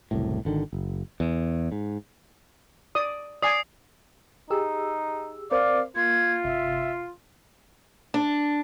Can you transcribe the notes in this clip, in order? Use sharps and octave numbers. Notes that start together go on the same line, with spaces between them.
F#1 C2 A2
G#1 D3 D#3
F#1
E2
G#2
D5 D#6
D5 G#5 D#6 C7
D#4 G4 G#4 E6
C4 A#4 C5 D5 F5
A#3 F4 G#6
G1 C3 E5
D4